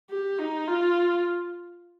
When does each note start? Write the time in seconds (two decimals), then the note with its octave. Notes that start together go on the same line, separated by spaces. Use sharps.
0.10 G4
0.39 D#4
0.68 F4